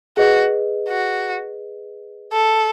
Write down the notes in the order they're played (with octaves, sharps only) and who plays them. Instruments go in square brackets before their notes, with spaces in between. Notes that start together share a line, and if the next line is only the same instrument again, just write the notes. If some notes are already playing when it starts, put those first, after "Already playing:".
[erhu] F#4 [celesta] G#4 B4 D#5
[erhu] F#4
A4